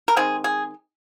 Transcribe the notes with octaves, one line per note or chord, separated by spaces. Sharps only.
A#4
D#3 G#3 C4 G#4
G#4